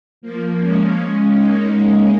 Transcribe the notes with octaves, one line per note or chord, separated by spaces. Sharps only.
F3 A#3
G#3 C#4
A#3 D#4